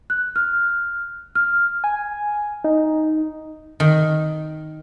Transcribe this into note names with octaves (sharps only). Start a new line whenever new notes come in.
F#6
F6
F6
G#5
D#4
D#3